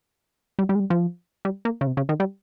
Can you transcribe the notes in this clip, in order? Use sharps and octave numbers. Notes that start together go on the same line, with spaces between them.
G3
G3
G#3
G3
F3
G3
A#3
C#3
C3
C#3
D#3
G3